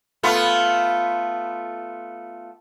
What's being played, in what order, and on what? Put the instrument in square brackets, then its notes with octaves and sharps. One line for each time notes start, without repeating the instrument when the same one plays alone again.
[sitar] A3 B3 F4